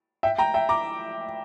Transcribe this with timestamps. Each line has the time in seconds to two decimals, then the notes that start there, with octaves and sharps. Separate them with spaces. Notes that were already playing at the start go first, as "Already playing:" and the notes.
0.23 E5 G5
0.38 G5 A#5
0.54 E5 G5
0.69 A#5 D6